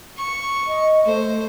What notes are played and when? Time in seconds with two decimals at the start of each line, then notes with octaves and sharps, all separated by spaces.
0.17 C#6
0.67 D#5
1.06 A3 C5